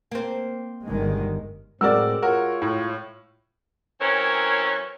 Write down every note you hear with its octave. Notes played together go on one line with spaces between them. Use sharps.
A#3 C4
G1 D#3 G#3
A2 G#3 C4 F#4 A#4 D5 E6
F4 F#4 A#4 C#5
A2
E3 F#3 C4 C#4 A#4 C#5